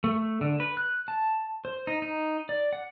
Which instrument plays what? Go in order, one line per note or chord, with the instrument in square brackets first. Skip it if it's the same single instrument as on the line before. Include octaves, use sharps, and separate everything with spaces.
[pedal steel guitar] A3
D3
B4
F#6
A5
C5
D#4
D#4
D5
F#5